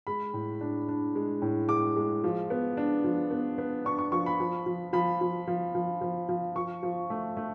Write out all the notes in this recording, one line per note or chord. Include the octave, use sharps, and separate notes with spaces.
G#3 B5
A2
D4
D4
G#3
A2
G#3 D6
G#3
F3
B3
D4
F3
B3
B3
D4 C#6
C#6
F3 C#6
B5
F3
F3
F3 B5
F3
F3
F3
F3
F3
F3 C#6
F3
A3
A3